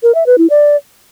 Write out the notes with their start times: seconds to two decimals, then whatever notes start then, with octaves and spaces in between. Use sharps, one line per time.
0.03 A#4
0.15 E5
0.26 B4
0.38 E4
0.50 D5